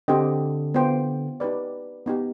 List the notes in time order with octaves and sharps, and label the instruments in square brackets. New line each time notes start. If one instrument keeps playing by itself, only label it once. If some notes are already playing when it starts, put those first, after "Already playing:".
[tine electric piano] D3 [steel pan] C4 G4 C5 D#5 G5
[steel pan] B3 F4 C5 G5
D#4 G4 B4 D5
B3 D#4 G4